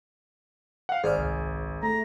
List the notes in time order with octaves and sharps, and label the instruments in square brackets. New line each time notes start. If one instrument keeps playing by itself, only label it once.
[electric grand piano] F5 F#5
[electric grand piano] G#1 [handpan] G#4 [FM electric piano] C5 D5 F6
[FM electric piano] C2
[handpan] A3 [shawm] A#5